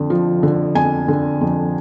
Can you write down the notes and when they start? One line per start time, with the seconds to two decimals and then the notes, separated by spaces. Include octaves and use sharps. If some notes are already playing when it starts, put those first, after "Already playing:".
Already playing: F2 D3
0.10 F3
0.43 D3
0.75 F2 G#5
1.08 D3
1.41 F2